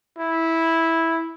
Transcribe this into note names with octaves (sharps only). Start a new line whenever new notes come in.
E4